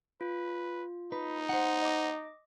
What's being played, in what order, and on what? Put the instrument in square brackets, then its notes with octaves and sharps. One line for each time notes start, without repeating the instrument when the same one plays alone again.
[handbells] F4 [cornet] B4
[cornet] D#4 [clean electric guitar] B4
[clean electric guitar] C5 F#5
[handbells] D#5 D6